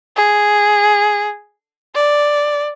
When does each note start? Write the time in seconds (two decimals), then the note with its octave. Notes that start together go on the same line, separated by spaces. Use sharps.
0.16 G#4
1.95 D5